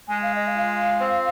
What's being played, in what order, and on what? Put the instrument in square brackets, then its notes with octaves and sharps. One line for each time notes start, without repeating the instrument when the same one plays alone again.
[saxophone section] G#3 [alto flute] G#5
[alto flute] F5
D#5
F5
[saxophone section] F4
C4